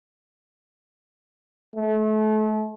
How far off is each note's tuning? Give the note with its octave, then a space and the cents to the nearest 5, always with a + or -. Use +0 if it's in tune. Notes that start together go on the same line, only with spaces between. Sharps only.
A3 -35